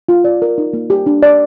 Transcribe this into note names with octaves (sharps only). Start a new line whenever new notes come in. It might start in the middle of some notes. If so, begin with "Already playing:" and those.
F4
D5
A#4
D#4
A#3
G4
D4
D5